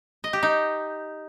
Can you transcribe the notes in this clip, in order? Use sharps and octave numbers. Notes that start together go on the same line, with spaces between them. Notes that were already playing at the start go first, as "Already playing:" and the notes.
D#5
G4
D#4